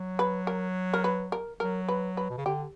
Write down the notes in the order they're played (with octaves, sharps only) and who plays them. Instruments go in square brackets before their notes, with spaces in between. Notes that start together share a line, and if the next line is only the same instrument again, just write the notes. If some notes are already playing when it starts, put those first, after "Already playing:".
Already playing: [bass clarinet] F#3
[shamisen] B4
A#4
A#4
B4
A#4
[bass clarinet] F#3 [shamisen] A#4
[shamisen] B4
B4
[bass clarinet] B2
C#3
[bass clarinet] D3 [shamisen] G4